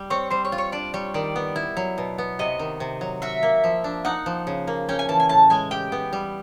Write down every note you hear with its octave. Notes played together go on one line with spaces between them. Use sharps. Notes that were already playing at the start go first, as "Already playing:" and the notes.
Already playing: G3
C4 C#5
G3 C5
C#5
F4
C#5
D4 D5
G3 C#5
D#3 D5
B3
E4
F#3
B2
B3
C3 D#5
D#3
C3
F#3
F#4 E5
A#3
F3
D4
D#4 F#5
F3
C#3
A#3
C#4 G5
G#5
E3 A5
G#5
A2 A5
G#3 G#5
G4 G5
B3
G3